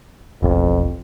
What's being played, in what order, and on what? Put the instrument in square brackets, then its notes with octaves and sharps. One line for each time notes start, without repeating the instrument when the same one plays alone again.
[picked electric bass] E1 A1 [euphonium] F2